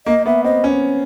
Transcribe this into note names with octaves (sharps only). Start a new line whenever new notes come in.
A#3 D#5
B3 E5
C4 D#5
C#4